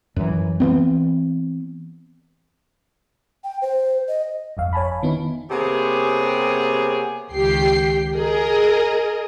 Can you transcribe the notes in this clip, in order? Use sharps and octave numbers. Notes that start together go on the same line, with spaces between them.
F#2 E3
E3 B3 C4
G5
C5
D#5
G1 F2 F5
C#5 G#5 A5 B5
B5
D#3 B3 D#4 E4
C3 A#3 B3 G4 G#4 C#5
C#2 D#3 G4 G5 C7
G#4 A#4 D#5